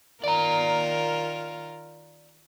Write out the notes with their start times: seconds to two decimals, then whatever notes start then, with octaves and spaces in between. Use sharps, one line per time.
0.24 D#3 F4 A#4 D5 A#5